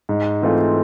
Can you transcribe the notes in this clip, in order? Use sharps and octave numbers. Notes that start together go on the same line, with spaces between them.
G#2
E3 A3 C4 F4